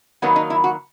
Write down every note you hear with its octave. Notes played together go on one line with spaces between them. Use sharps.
D#3 F#3 A#3 B3
D#4
E4
F#4